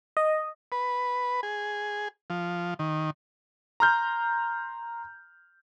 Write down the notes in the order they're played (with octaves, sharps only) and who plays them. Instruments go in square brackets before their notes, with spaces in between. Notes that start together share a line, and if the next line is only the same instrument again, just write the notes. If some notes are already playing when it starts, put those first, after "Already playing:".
[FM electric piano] D#5
[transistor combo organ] B4
G#4
F3
D#3
[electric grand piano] A#5 C6 F6 G6